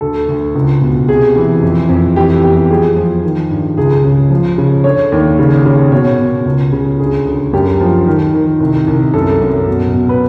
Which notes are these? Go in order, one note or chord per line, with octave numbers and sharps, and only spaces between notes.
D2 A4
D2
C#2
B2
C3 G#4
E3
F2
F2
E3 G4
E2 G4
F3 G#4
F3
D#3
G2
C#2 G#4
C#3
F3
C#3
D3 C#5
D#2
C#3
C#3
B2 C#5
B2
C#2
C#3
D2 G#4
D2
F#2 G4
F3
D#3
D#3
C2
C2
F#2 A4
F#2
B2
B2
B4